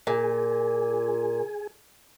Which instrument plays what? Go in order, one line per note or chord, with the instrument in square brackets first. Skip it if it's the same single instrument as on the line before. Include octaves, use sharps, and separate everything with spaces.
[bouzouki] A#2 [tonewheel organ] G#4